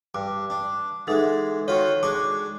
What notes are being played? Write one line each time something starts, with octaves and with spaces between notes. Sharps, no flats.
G2 D6
D4
E3 G#3 D#4 A4 F#5
D#3 F4 F#4 C#5 C#6
G#3 D4 C#6 D6